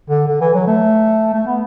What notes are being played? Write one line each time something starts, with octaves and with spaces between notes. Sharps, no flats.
D3
D3
E3
F#3
A3
A3
B3